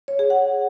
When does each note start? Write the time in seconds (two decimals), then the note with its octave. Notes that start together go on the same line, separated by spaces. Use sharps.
0.08 C#5
0.19 G#4
0.30 F#5